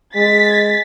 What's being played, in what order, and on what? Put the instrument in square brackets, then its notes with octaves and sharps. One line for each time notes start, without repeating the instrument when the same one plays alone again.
[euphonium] G#3 [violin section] A6 B6